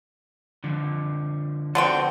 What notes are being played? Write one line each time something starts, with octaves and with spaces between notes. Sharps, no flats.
D3 F3
D3 B3 C4 F#4